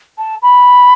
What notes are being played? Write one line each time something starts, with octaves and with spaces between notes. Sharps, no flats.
A5
B5